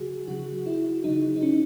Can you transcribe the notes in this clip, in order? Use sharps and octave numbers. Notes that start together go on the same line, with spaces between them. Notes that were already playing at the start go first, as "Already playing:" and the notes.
Already playing: C#3 F#3 F#4 G#4
C#3 F#3 F#4
E4
C#3 F#3 D#4
D#4
C#4